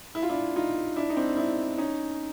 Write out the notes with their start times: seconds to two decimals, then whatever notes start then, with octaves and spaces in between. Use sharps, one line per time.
0.15 E4
0.23 F4
0.29 D4 E4
0.56 D#4 F4
0.96 D4 E4
1.10 D#4
1.16 C4 D4
1.37 D4 E4
1.78 C#4 D#4